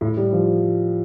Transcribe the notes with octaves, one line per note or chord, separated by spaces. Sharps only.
A2
G3
F3